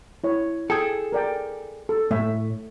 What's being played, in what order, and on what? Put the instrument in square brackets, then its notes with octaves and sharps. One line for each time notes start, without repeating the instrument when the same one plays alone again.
[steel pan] E4 C#5
[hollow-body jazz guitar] G#4 A4 [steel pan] G5 A5
[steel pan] A#4 D5 G5
A4
[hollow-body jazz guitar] A2 [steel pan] A3 E5